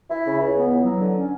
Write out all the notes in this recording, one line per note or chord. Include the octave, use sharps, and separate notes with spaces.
E4
C#3
C#2
B3
E3
F#3
D3
C#4